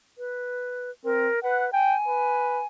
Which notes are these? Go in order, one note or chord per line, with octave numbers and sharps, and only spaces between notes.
B4
C4 A#4
B4 F#5
G5 G#5
B4